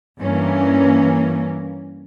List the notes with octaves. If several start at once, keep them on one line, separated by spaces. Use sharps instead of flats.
G2 E3 A#3 C#4